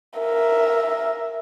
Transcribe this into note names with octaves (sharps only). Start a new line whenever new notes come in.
A#4 E5